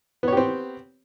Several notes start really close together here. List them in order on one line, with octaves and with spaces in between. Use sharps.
B3 C#5 G4 C4